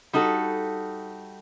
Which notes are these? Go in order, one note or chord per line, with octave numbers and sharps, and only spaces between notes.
G3 D#4 F#4 A4